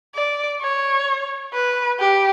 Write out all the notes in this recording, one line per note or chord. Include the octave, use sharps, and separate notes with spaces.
D5
C#5
B4
G4